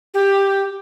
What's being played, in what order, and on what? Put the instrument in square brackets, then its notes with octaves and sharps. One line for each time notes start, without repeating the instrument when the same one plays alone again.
[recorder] G4